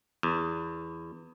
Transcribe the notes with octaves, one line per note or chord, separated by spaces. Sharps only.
E2